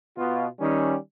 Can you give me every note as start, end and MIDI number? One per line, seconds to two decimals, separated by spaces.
0.17 0.46 47
0.17 0.46 65
0.59 0.96 51
0.59 0.96 55
0.59 0.96 61